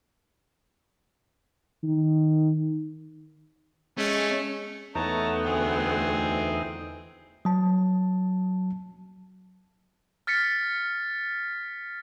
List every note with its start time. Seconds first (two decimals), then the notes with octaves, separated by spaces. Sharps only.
1.83 D#3
3.98 G#3 A3 C#4
4.95 E2 E3 A3 B3 D#4 C#5 A5 A#5
5.46 D2 C4 G#4
7.45 F#3 A5
10.27 F6 A6 B6 C#7